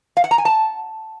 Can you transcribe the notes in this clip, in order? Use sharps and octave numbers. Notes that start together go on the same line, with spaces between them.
F5
F#5
A#5
G#5
A5